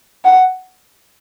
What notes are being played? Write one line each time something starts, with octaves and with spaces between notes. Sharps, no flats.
F#5